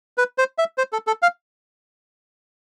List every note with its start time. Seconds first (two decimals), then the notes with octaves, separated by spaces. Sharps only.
0.18 B4
0.38 C5
0.58 E5
0.78 C5
0.93 A4
1.07 A4
1.22 F5